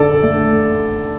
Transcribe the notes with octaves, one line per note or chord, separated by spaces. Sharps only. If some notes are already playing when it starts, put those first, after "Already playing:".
Already playing: D3 A4 D5
A3